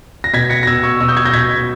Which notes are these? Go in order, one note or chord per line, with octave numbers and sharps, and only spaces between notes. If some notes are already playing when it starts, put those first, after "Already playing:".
A#6
B2 G#6 B6
A#6 C#7
A#6
B2 E6 G#6
C#6 E6
B2 C#6 E6
D#6 G6
E6 G#6
G6 A#6
B2 G#6 B6